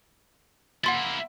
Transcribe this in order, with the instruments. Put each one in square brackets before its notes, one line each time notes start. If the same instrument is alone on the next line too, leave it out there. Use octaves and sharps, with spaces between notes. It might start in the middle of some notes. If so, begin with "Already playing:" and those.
[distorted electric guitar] A#3 E4 [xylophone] F#5 C6 A6